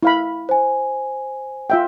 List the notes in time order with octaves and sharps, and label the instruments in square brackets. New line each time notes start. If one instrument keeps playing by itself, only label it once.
[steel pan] E4 F5 B5
[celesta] C5 G#5
[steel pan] F4 E5 G5